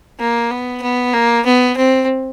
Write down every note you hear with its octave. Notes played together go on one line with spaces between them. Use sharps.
A#3
B3
B3
A#3
B3
C4